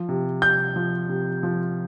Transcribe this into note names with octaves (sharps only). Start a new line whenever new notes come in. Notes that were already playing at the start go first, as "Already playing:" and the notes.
Already playing: F3
C3
C3 G6
F3
C3
F3